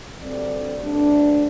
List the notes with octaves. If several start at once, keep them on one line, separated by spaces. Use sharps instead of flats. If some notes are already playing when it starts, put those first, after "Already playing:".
D2 G2 G3 C4 A4 D5
D2 G2 A3 D4